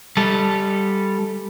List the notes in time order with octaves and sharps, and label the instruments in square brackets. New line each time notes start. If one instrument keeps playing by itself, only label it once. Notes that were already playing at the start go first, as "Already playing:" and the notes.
[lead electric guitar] G3 A4